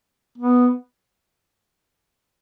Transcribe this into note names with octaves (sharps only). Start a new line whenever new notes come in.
B3